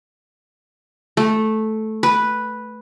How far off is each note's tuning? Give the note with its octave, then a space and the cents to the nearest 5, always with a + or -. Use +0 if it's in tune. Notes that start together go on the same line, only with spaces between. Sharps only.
A3 -10
B4 -5